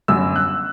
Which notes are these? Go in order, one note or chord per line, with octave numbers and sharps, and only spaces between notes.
G1 F#2 F#3 E6
F#6